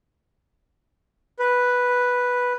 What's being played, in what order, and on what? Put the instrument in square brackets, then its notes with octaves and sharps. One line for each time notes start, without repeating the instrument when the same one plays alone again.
[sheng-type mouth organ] B4